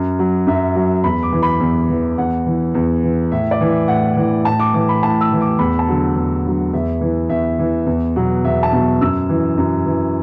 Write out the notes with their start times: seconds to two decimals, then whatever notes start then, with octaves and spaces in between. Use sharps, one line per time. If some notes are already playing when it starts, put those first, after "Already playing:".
Already playing: F#2
0.19 F#3
0.47 F#2 E5
0.75 F#3
1.04 E2 B5
1.23 D6
1.32 E3
1.43 B5
1.60 E2
1.89 E3
2.18 E2 F#5
2.46 E3
2.74 E2
3.03 E3
3.31 A2 E5
3.51 D5
3.61 E3
3.69 E5
3.88 A2 F#5
4.17 E3
4.45 A2 A5
4.60 D6
4.74 E3 D6
4.89 B5
5.03 A2 A5
5.21 E6
5.31 E3
5.41 D6
5.59 E2 B5
5.79 A5
5.88 D3 F#3
6.16 E2
6.45 D3 F#3
6.73 E2 E5
7.01 E3
7.30 E2 E5
7.59 E3
7.86 E2
8.16 B2 F#3
8.44 E2 E5
8.63 A5
8.73 B2 F#3
9.01 F#2 E6
9.29 E3
9.58 F#2
9.86 E3